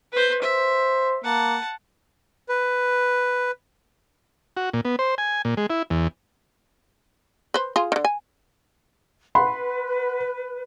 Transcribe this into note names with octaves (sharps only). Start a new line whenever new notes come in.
B4 C5
C5 E5
A#3 F#5 A5
B4
F#4
A#2
B3
C5
G#5
A#2
G#3
E4
E2
B4 C5
F4 G#4
D3 D#3
G#5
B4 F#5 B5 C6